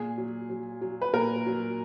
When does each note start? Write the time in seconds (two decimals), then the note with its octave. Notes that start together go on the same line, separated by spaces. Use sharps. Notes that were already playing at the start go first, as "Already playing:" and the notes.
Already playing: A#2 G#4
0.18 F#3
0.49 F#3
0.81 F#3
1.02 B4
1.13 A#2 A#4
1.46 F#3